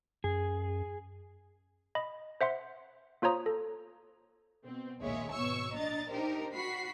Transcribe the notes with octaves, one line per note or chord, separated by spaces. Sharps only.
F#2 G#4
D#5 B5
C5 E5 F#5 C6
A#3 F4 C5 C#5 A#5 D#6
A4
B2 C4
A#1 D#2 G#3 C#5 E5
G#1 B2 C#5 C#6 E6
A#1 D4 D#5 A#5 A6
D4 D#4 G4 A#4 C5
F#4 B5 B6 C7